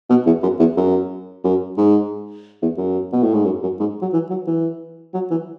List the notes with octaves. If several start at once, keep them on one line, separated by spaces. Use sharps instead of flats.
B2
E2
F#2
E2
F#2
F#2
G#2
E2
F#2
B2
A2
G#2
F#2
F#2
G#2
F#3
E3
F#3
E3
F#3
E3